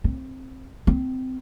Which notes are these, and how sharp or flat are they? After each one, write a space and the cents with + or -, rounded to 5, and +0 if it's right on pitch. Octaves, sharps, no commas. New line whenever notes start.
C4 +10
C4 -20